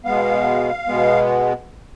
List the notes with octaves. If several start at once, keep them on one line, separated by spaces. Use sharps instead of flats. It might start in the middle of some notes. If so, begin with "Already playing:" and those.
B2 G#3 B3 F5
B2 G#3 B3